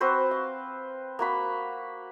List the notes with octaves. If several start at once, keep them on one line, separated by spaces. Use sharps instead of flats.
C4 F#4 B4 C5
F5
A#3 F#4 B5